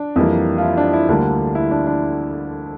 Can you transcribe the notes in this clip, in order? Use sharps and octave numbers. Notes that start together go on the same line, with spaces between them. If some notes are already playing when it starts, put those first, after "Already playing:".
Already playing: D4
F2 E3 G3 A#3
F4
E4
D4
E4
D2 D3 G3 A#3 D4
E4
D4
D4